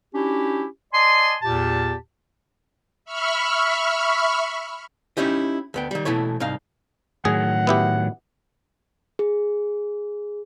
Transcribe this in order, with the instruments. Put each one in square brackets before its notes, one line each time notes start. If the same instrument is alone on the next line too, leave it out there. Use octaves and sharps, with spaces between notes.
[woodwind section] C#4 D4 E4 F#4 G4
D5 D#5 G#5 A5 C6
E2 A#2 G4 A5
[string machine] E5 B5 C#6 F6
[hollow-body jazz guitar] C#4 D#4 E4 G4 D#5
D2 B3 G5
D#3 G3
B2 E3 A3 E4 C#5
C2 G#2 D#4 F5
[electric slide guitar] A2 D#3 F#3 [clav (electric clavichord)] G#4 [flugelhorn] F#5
[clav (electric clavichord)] B3 E4 G4
[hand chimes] G#4